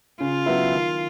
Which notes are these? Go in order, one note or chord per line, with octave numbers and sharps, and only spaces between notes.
C#3 F4
F#3 B3 E4
D#3